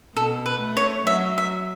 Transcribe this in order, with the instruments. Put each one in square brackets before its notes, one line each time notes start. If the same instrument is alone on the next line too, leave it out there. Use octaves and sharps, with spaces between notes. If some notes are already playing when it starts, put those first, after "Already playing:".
[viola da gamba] B2 [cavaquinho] A4
[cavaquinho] B4
[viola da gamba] A3
[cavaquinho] C#5
[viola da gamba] F#3 [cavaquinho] E5
[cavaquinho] E5